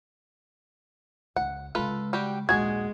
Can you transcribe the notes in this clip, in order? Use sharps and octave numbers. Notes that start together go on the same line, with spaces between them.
C#2 F#5
C#3 G#3 F4 A4 B4
G3 F#4 G4
A#1 D#2 G#3 F#4 G#4 G#6